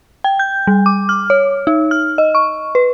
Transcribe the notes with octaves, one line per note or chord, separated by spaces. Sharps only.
G5
G6
G3
D6
F6
C#5
D#4
F6
D#5
C#6
B4